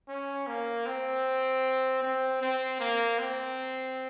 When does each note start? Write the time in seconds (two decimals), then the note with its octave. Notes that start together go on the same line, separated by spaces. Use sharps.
0.08 C#4
0.47 A#3
0.86 C4
2.03 C4
2.42 C4
2.80 A#3
3.19 C4